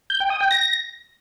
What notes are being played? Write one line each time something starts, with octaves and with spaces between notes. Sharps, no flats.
G6
G5
D#6
G5
A#6